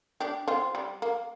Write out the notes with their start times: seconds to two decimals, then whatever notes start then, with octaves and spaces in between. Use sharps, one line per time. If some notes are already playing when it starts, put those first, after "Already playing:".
0.20 D4 G4
0.48 C4 F4
0.75 G3
1.02 A#3